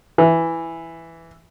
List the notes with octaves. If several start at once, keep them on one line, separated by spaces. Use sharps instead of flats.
E3